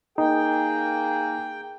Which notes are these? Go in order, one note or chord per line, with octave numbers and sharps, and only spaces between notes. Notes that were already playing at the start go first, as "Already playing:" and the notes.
A#3 D#4 G#4 G5